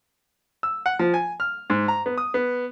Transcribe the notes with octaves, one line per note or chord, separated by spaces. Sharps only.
E6
F#5
F3
G#5
F6
G#2
A#5
B3
D#6
B3